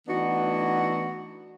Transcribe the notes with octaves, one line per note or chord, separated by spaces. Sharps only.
E3 A3 B3 D4 D#4 F#4